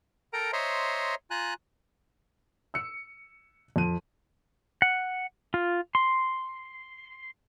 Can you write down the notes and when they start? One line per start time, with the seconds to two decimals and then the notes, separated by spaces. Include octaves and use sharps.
0.33 A4 A#4 G5 A#5
0.53 C5 C#5 D#5 E5 A#5 C6
1.31 F4 G#5 A#5 F#6
2.74 E6 C#7
3.76 F2 D#7
4.82 F#5
5.54 F4
5.95 C6